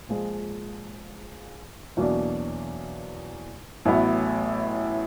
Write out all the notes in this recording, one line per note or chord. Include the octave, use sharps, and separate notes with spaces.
A#2 F3 G#3
E2 B2 F#3 A#3 D4
A1 A2 F#3 B3